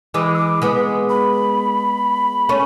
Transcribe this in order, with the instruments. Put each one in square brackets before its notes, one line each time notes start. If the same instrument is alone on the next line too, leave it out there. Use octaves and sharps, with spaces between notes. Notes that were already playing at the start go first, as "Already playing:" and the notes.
[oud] E3 G#3 [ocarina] D6
[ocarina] E6
D6
[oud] G#3 B3
[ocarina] B5
[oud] A3 C#4